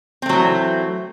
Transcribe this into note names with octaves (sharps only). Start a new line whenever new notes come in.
E3 F#3 A3 C4